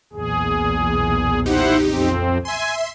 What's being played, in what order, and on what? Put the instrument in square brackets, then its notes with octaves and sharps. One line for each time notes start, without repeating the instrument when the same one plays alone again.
[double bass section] B1 E2 A#2 [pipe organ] G#4
[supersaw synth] D#4 G4 [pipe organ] E4 C5 F#5
[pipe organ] F2 C4
[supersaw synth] E5 C6 [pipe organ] G#5